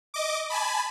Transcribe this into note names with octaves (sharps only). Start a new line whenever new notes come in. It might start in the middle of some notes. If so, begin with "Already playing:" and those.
D#5 D6
G#5 A5 B5